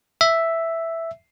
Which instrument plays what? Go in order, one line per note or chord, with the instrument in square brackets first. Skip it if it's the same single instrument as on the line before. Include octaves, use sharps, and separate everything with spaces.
[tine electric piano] E5